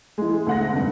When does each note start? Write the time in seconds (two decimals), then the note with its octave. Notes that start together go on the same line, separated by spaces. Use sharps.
0.18 E3 G#3
0.47 D2 F#5 A#6
0.72 F1 G2